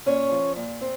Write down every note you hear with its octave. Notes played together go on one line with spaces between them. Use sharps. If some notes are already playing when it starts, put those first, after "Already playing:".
A#2 C#4 C#5
F3
A#2
C4